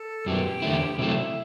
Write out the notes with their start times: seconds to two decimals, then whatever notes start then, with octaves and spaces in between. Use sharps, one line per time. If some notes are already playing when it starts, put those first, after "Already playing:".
Already playing: A4
0.26 F#2 F#3 B3 G4
0.62 E2 D3 A3 E4
0.99 C3 F#3 A3 E4